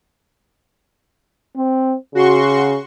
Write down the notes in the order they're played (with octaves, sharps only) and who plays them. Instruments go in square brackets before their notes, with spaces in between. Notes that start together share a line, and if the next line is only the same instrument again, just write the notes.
[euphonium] C4
[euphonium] C#3 [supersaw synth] F#4 C6 C#6